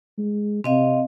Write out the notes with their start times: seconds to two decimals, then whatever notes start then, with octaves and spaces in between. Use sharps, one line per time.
0.18 G#3
0.64 C3 C4 D#5 F5